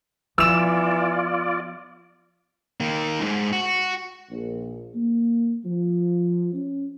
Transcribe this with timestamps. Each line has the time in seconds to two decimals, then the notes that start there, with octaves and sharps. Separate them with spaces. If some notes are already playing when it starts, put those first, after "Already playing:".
0.38 E3 F3 B3 F4 D5 E6 E7
2.80 D#3 A#3
3.20 C2 G#2
3.53 F#4
4.30 A#1
4.95 A#3
5.65 F3
6.53 C#4